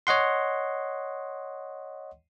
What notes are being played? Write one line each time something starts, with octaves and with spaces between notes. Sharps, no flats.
C#5 D#5 F#5 C6